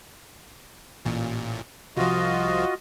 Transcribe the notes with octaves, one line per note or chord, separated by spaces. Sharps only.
A1 A#2
C2 F3 F4 F#4 D#5